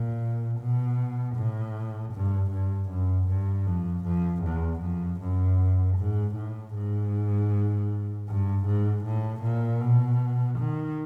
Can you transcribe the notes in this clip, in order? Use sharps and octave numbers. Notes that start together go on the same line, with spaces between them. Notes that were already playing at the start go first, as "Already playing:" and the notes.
Already playing: A#2
B2
A2
G2
G2
F#2
G2
F2
F2
E2
F2
F#2
G#2
A2
G#2
G2
G#2
A2
A#2
B2
D#3